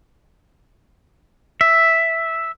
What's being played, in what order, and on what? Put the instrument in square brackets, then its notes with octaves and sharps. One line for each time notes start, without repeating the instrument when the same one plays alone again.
[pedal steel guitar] E5